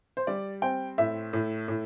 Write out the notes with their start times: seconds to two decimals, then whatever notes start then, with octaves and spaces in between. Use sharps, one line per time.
0.17 C5
0.27 G3 D5
0.62 C4 G5
0.98 A2 E5
1.33 A2
1.68 A2